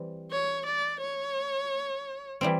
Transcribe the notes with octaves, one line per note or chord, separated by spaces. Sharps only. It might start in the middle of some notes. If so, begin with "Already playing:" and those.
Already playing: E3 G3 C4
C#5
D5
C#5
E3 G3 C4